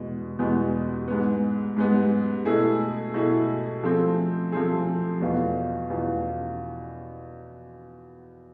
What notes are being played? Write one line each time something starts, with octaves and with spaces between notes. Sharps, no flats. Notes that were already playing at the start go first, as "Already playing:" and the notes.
Already playing: E2 B2 G#3 B3
E2 B2 G#3 B3
G#2 G#3 B3
G#2 G#3 B3
B2 A3 E4 G#4
B2 A3 E4 G#4
F3 A3 C4 G#4
F3 A3 C4 G#4
E2 B2 B3 F4
E2 B2 B3 F4